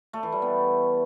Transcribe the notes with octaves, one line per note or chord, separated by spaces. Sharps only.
A3
E3
G3
B3